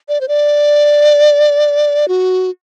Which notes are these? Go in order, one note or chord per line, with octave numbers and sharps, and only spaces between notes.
D5
C5
D5
F#4